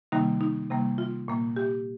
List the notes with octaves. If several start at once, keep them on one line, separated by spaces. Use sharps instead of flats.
C3 D#3 G3 A#3 D#4
D#4
C3 G3 A#3
F4
A#2 A#3
G4